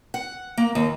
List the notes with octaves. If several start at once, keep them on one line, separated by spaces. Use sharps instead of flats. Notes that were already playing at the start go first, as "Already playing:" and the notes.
F#5
A#3
D#2